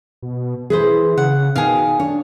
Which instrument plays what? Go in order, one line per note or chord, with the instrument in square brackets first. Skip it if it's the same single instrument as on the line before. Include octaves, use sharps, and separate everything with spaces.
[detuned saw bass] B2
[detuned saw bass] E3 [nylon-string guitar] G#4 B4 C5
[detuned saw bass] C#3 [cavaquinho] F#5
[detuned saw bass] B2 [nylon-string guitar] D#3 [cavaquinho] G#4 F5
[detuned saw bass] D4 [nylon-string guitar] C#5